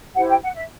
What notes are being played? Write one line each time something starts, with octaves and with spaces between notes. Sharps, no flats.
E4 G4 C5 F#5
G5
F#5
E5